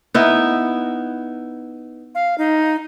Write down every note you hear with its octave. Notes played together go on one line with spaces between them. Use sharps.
B3 D#4 E4
F5
D#4